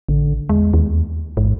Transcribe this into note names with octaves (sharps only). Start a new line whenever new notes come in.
A1 D3
E2 G#3
D#2
A1 G#2